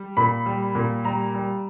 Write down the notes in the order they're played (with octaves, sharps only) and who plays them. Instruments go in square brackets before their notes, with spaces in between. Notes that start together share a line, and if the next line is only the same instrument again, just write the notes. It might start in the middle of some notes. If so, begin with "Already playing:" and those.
Already playing: [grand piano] G3
A#2 B5
G3
A#2
G3 A#5
G3